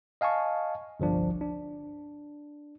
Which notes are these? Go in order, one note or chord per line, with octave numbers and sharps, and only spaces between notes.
D#5 F5 G#5 A5 C#6
G1 C2 F3 D4
D4